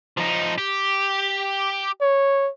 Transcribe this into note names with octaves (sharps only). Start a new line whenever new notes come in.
F3 D#4
G4
C#5